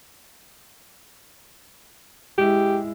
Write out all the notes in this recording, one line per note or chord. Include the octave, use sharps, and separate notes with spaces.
G#3 E4 G4